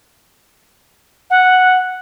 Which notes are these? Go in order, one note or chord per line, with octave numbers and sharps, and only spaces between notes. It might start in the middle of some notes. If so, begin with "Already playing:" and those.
F#5